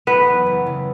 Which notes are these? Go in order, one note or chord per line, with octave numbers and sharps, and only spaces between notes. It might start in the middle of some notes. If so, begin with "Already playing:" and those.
F#1 B3 B4
E2
F#1
C#3